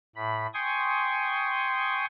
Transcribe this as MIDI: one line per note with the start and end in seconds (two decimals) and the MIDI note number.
0.16 0.47 45
0.16 0.47 83
0.54 2.05 79
0.54 2.05 80
0.54 2.05 84
0.54 2.05 85
0.54 2.05 87